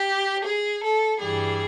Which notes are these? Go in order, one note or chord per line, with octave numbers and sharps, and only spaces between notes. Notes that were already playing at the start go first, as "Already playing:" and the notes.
Already playing: G4
G#4
A4
G2 E3 G3 G#4